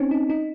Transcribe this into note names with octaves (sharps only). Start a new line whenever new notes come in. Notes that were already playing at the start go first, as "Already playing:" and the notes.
Already playing: C4 C#4 D#4
D#4
D#4